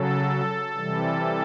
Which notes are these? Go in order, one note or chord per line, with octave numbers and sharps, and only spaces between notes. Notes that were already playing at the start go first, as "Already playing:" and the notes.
Already playing: C#3 F#3 A4
C3 E3 G3